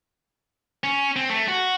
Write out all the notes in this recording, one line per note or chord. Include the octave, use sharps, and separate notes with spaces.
C#4
C4
A3
F#4